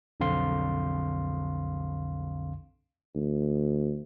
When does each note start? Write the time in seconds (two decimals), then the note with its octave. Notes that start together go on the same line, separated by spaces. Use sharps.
0.20 B1 F2 D3 C4 F5 C6
3.15 D2